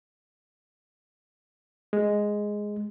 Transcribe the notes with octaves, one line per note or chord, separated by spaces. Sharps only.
G#3